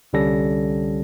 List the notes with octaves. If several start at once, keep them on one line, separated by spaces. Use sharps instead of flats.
C2 D3 G3 C#4 A4 A#6